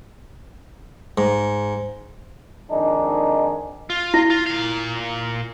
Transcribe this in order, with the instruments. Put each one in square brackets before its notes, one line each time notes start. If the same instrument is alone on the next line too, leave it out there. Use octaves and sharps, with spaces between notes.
[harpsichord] G#2
[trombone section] F2 D#3 G#3 D4 D#4
[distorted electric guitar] F4
[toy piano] E4
[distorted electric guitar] F4
A#2 F5